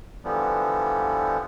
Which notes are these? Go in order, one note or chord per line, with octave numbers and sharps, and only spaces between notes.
D3 E3 F3 G3 B3